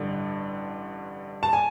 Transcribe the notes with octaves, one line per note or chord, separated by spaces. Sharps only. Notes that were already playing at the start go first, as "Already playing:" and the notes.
Already playing: A1 G2 D3
A5
G#5